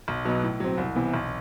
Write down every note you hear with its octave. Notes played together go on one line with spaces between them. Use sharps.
B1
B2 F#3 B3 D#4
A2
F#3 C4
C2
C3 E3 B3
B1